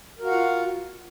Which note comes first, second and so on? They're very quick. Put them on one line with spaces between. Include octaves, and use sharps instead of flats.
A#4 F#4 F5 F#5 F4